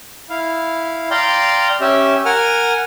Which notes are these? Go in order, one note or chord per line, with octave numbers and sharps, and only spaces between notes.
E4 F5
D5 F5 G5 A#5 C6
C#4 G4 E5
A#4 F#5 G#5 F6